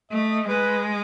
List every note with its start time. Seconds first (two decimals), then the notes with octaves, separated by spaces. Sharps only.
0.11 A3 D#5
0.48 G#3 B4